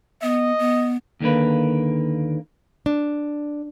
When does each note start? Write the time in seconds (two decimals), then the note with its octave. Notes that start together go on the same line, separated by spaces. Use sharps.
0.22 B3 D#5
0.59 B3
1.20 D#2 D3 A#3 B4
2.86 D4